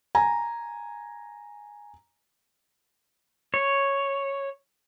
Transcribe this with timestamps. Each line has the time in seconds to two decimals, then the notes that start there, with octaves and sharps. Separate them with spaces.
0.15 G#5 A#5
3.54 C#5